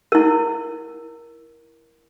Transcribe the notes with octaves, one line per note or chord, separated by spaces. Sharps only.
E4 A#4